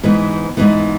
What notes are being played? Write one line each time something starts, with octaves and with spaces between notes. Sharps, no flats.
G#2 E3 B3
G#2 E3 B3